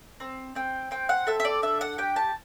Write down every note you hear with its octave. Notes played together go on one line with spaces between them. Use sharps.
C4
C4 G5
C4 G5
F#5
A4 E5
E5
D5
D4 E5
F#5
G4 G5
A5